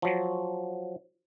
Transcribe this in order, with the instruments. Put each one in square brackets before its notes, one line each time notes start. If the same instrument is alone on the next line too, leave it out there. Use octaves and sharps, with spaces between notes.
[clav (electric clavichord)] F3 F#3